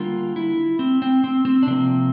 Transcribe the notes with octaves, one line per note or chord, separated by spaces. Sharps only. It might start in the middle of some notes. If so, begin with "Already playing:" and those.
Already playing: D3 G3 A#3 F4
E4
C4
C4
C4
C4
D4
C3 F3 A#3 C4